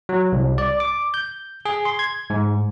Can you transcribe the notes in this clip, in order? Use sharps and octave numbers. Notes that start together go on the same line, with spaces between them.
F#3
C2
D5
D6
G6
G#4
C6
G#6
G#2